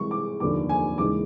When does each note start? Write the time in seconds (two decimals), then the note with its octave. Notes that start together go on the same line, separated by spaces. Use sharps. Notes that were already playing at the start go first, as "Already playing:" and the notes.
Already playing: C2 C3 E3 G#3 C#6
0.11 D6
0.40 F1 D#2 D3 G3 D6
0.69 G#5
0.98 D#2 C#3 E3 G#3 D6